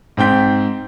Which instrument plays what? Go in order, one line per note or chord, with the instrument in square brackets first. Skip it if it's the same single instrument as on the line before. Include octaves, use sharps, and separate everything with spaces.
[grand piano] G#2 C4 G5 G6 B6